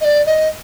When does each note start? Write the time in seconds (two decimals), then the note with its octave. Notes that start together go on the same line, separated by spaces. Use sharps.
0.01 D#5
0.05 D5
0.26 D#5